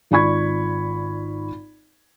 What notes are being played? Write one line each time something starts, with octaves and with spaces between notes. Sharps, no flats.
G#1 F4 D5 B5 C#6 G#6